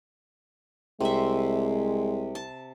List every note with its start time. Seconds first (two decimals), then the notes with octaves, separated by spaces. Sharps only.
1.00 C2 C3 G#3 E5
2.35 A5